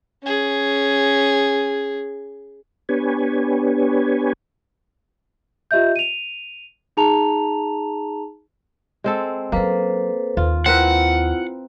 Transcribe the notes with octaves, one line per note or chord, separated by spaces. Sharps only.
C#4 G#4
B3 D4 G4 B4 C#5 G#5
F4 G4 D#5 E5 G6
D#7 F7
D#4 G#4 A5 A#5 F7
G#3 C4 A4
F#3 A#3 C#4 A4 B4 C5
D#2 F4
C4 E4 F4 A#4 B4 F#5